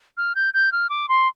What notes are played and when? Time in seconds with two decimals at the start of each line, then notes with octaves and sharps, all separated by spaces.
0.17 F6
0.35 G6
0.54 G6
0.72 F6
0.90 D6
1.09 C6